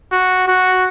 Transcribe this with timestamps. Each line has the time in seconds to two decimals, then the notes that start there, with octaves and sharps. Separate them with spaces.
0.11 F#4
0.48 F#4